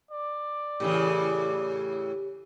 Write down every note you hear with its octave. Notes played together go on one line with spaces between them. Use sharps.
D5
A2 C#3 E3 G4